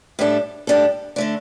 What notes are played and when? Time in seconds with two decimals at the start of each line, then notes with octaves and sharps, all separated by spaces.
0.19 A2 G3 D4 A4
0.67 A2 G3 D4 A4
1.16 D3 A3 D4